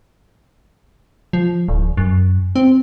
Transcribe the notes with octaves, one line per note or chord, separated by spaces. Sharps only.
F3
D1
F#2
C4